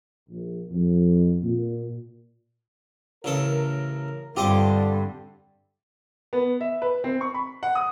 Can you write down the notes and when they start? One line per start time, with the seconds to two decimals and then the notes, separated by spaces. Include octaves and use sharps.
0.29 A#1
0.71 F2
1.42 A#2
3.24 A1 C#3 A4 A#4
4.36 G2 D3 C4 F4 G4 D#5 D6
6.33 B3
6.61 E5
6.82 B4
7.04 C4
7.21 C#6
7.34 B5
7.63 F#5
7.75 D#6